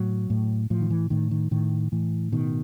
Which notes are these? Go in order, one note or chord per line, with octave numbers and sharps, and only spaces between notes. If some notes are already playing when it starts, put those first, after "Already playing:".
Already playing: A2 F#3
A2
A2 F3
D#3
E3
A2 D#3
D#3
A2 D#3
A2 E3
B2 D#3